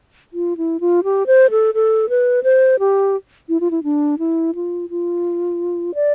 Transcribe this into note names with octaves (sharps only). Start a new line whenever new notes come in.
F4
E4
F4
G4
C5
A4
A4
B4
C5
G4
E4
F4
E4
D4
E4
F4
F4
D5